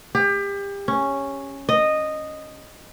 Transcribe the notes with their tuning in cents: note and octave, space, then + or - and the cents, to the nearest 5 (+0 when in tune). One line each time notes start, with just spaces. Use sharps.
G4 +30
C#4 -5
D#5 -10